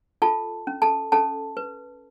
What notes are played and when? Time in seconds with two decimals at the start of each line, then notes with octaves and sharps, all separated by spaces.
0.22 F4 A4 A5
0.67 C#4
0.82 A4 A5
1.12 C#4 A4 A5
1.57 B4